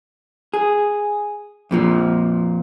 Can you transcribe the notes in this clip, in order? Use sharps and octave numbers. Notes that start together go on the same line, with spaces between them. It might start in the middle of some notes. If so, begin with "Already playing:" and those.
G#4
F2 A#2 F3